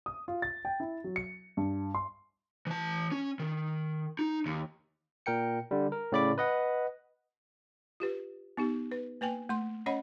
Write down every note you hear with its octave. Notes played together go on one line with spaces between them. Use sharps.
D#6
F4
A6
G5
E4
F#3
C#7
G2
C6
E3 A5
C#4
D#3
D#4
D#2
A#2 A#4 G5 C#7
D3 G3
A#4
A2 C#3 D5 B5 D6
B4 D#5 F#5
F4 G4 B4
B3 D#4 G4
B4
A#3 B4 G5 G#5
A3 C6
C#4 C#5 D#5 F#5 B5